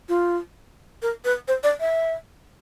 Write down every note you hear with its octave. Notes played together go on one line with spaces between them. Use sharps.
F4
A#4
B4
C5
D5
E5